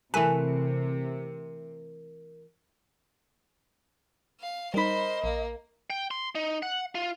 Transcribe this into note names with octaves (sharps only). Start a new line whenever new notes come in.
C3 E3 A3 A#4 B4 G#5
F5
G3 D#4 A#4 C5 D#5 B5
A#1 A#3
G5
C6
D#4
F#5
F4